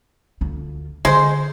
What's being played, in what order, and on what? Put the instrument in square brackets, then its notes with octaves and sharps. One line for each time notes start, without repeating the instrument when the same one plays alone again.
[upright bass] D2 F4
[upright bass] D3 F4 [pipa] G#3 C5